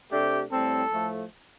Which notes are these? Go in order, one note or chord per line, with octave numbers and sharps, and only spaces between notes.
C3 A3 D4 G4
A2 G3 C4 A4
A2 F3 A3